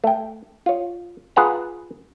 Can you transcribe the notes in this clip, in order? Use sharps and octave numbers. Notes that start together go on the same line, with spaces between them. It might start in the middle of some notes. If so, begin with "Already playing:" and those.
A3 G5
F4 C#5
F4 G#4 B4 F#5 A#5